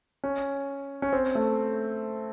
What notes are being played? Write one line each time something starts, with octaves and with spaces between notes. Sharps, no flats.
C#4
C#4
C4
A3